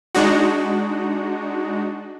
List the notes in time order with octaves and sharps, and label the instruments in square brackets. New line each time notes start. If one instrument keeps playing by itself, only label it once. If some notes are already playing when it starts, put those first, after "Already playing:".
[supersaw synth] G#3 D4 D#4 F#4